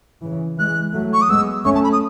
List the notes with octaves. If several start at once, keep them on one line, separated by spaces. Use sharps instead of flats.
C#3 E3
E3 G#3 F#6
F#3 A3
C#6
D#6
G#3 B3 E6
A3 C#4 C#6
A5
B5
D#6